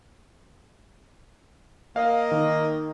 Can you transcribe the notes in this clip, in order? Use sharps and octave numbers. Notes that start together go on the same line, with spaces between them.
A#3 D#5 F5
D#3